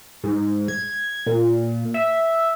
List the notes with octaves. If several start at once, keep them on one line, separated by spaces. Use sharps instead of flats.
G#2
G#6
A#2
E5